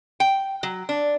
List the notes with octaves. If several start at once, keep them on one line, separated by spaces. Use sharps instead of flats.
G5
F#3
D4